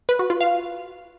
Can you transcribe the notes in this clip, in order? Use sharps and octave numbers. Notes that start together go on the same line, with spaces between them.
B4
F#4
F4
F5